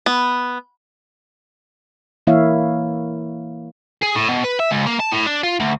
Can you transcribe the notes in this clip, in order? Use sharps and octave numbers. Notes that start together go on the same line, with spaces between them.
B3
E3 A#3 E4 C#5 E5 F5
G#4
A2
B2
B4
E5
C#2
A#3
A5
A2
D4
F4
D2